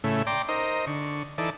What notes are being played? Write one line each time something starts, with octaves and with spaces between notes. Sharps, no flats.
A2 C#3 A3 E4
D5 G5 A#5 C6 D6
D#4 A#4 C5 D#5
D3 C#6
E3 D#4 A4 D5